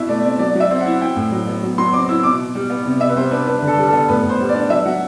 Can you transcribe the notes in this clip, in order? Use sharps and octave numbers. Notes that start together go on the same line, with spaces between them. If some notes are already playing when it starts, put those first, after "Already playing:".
Already playing: B2 E4 E5
A3 D5
C4 D5
F#3 D5
F#3
E5
C4
E4 F#5
E4 G5
A2
F#3
B3
F#3
F#3 C6
C4 D6
E4 E6
B2 D6
B2
G3
B3
C3
C3 E5
B4
G3 C5
D4 B4
D4 B4
D3
A4
G3
B3 A4
A2 B4
A2
C5
G3
D5
D4
F#3 E5
F#3 F#5